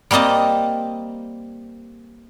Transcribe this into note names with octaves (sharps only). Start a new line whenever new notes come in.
G3 A#3 C4 D#5 A5